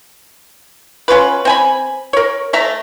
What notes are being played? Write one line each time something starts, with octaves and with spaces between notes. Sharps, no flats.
C#4 F4 F#4 B4
C4 G#5 B5
A#4 C#5
A3 E5 A#5